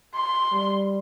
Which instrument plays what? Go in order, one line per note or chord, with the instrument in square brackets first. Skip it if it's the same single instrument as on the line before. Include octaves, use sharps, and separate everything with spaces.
[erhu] C6
[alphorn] G3